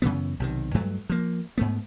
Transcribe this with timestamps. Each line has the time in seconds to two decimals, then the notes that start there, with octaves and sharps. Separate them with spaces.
0.02 F#2 C#3 E3 B3
0.40 B1 C3 D#3
0.74 G2 F#3 A3
1.10 F3 A#3
1.58 G#2 A3 B3